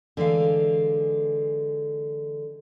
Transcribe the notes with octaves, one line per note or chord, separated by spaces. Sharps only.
D3 E3 G#3 F5